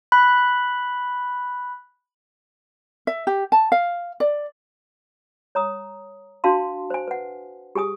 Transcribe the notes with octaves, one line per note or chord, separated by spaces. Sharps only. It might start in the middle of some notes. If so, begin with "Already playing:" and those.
B5 F#6
E5
G4
A5
F5
D5
C#5 A#5 D#6
D4 F#4 F5 A5 C6
C5 G#5
B4 F#5
G4 G#4 G#5 D#6